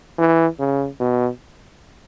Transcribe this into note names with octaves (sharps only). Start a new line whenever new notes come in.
E3
C#3
B2